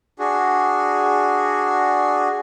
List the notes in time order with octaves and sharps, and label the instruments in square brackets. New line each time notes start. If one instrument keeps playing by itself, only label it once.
[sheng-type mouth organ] D4 F#4 G#4